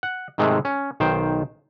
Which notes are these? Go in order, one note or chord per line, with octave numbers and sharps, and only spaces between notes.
F#5
G#2 C3 D#3 G#3 A3
C#4
B1 D#3 C5 G5